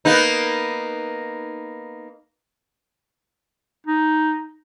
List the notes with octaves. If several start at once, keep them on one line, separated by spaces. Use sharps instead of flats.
A#3 B3 D#4
D#4